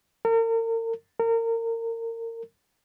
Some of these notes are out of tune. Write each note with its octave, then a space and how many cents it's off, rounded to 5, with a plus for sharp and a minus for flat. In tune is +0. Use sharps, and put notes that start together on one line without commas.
A#4 -40
A#4 -30